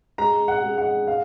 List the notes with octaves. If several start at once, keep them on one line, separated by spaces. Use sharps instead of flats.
G#3 A#5
F#5
G#3
F#5
F5